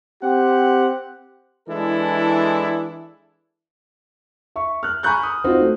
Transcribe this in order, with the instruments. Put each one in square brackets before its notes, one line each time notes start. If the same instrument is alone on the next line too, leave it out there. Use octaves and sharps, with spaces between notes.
[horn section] C4 G4 F#5
[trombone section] E3 G#3 D4 E4 A4
[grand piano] E5 C#6
F6 F#6
G#5 A#5 B5 C#6 F#6 G6
D#6
C4 D#4 F4 F#4 C5
A3